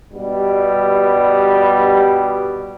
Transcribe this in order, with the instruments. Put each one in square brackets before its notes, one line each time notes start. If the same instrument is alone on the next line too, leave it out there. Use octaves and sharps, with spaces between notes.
[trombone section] G2 B2 G3